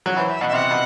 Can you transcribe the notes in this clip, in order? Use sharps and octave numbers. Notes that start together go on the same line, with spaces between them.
F#3
E3 C5
E5
B2 F#5
E5
C3 F#5
B2